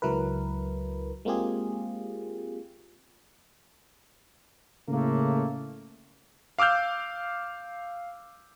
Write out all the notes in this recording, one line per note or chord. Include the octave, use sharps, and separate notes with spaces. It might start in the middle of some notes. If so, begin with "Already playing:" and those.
C#2 F#3 E4 A#4 B4
G#3 A#3 C4 F4 G4 G#4
A2 C#3 A3 A#3
F5 D6 E6 F6 G6